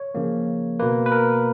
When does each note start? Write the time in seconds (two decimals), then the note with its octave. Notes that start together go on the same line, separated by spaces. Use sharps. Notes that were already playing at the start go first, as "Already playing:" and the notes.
Already playing: C#5
0.15 C#3 F3 A#3
0.79 B2 A#3 B4
1.06 B4
1.12 A#4